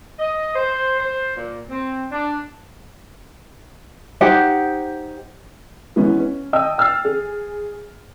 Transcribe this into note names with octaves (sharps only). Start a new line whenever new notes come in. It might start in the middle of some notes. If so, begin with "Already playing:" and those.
D#5
C5
C5
A#2
C4
D4
D#4 G4 C5 F#5
E3 G#3 B3 C#4
C#4
D#5 G5 A5 D#6 E6
G5 E6 F6 A6 C7
G#4